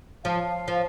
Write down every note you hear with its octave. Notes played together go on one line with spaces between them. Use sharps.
F3 F5
F3